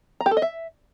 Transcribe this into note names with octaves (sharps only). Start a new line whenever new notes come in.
A#5
G4
A4
D#5
E5